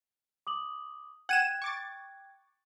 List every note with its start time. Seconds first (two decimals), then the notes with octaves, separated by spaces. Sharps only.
0.47 D6 D#6 F#7
1.29 F#5 G5 F#6 G#6 D#7 E7
1.62 C#6 D6 A6